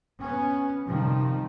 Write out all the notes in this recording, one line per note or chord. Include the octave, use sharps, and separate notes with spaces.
B3 C#4
C3 D#3 F3 G3